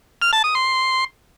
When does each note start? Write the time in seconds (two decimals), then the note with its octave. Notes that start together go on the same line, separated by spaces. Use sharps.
0.22 F6
0.33 A5
0.44 D#6
0.55 C6